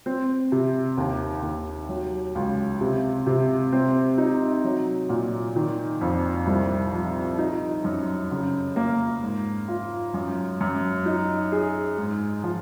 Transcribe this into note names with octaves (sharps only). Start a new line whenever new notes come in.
C4
C3
D#2
D#2
F#3
C#2
C3
C3
C4
D#4
F#3
A#2
D#3
F2
C2
F3
D#4
F#2
C#3
A#3
G#2
F4
F#2
F#2
D#4
G#4
G#2
F3